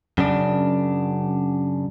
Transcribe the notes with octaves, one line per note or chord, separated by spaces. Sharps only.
F#2 C#3 D4